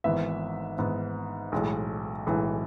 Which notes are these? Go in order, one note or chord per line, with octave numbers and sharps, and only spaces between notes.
G#1 G#2 E3 B3 E5
G#1 G#2 E3 B3
B1 A2 E3 G#3
B1 A2 E3 G#3